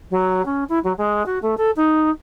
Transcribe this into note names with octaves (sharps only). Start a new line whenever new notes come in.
F#3
C#4
E4
F#3
G#3
F#4
A3
A4
D#4